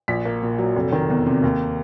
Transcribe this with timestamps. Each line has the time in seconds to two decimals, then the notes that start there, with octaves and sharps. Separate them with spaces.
0.08 A#1 B6
0.25 A#3
0.42 A#2
0.59 F#3
0.76 F1
0.92 D#3
1.10 E2
1.26 C3
1.44 D#2